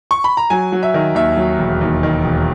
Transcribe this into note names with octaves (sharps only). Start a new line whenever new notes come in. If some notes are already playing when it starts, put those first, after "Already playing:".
C#6
B5
A#5
F#3 G#5
F#3
E5
D#3
D#2 E5
F#3
E1
D#2
D#3
E1